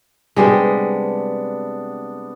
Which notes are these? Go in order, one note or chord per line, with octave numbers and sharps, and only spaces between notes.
C3 G3 G#3 B3 D4